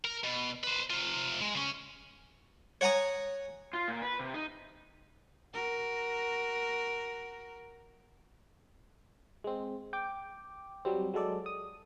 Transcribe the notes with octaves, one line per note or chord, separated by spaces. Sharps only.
A#4
B2
B4 C5
C3 F4
G#3
C#3 C#4
C#5 F#5 G#5 A#5 D#6
F4
A#2
B4
C3
D#4
F#4 A#4
G#3 C4
G5 D6
F#3 G3 C4
F#3 G#3 A4 D5
D#6